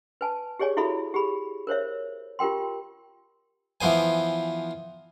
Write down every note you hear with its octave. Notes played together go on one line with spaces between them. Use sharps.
B4 G#5 A5
G4 G#4 C#5 D5 G#5
E4 F#4 A4 E5 B5
G4 G#4 B5
A#4 C5 C#5 E5
F4 G4 A#4 G5 C6
E3 F3 B3 C5 G#5